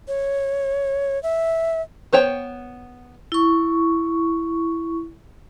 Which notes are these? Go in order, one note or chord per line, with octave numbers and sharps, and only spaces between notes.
C#5
E5
B3 C5 C#5 G5
E4 C#6